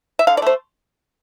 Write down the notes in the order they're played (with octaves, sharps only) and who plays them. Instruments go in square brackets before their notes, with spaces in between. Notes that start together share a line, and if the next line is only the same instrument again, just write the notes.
[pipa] E5
D3 F5
D5
A3 C5